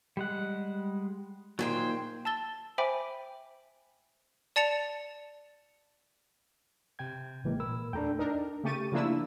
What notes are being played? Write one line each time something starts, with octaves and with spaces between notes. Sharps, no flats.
G3 G#3 F#5
A#2 D#3 F#3 G#4 C5 G5
A5 E6 A6 G7
C5 E5 G5 G#5 B5 D6
D5 A5 A6 C#7 F7
C3 G5 G#6
A1 C#3 E3 G#3 A#3
A#2 A#4 B5 E6
E2 A3 D4 A4 G5 A#5
D4 D#4 A#4
C#3 A3 G4 C#6 A6 D#7
C#3 F3 A#3 D4 E4 E6